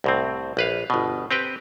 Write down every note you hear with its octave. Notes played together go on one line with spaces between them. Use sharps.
C2 A2 C4
A#1 B4 F5
G1 B2
C4 G4 B4 G5